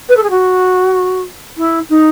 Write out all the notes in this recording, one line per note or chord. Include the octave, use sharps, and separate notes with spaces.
B4
A4
G#4
F#4
E4
D#4